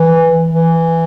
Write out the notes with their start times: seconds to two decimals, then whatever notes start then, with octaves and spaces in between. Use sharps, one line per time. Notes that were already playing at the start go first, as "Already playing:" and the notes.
Already playing: E3
0.50 E3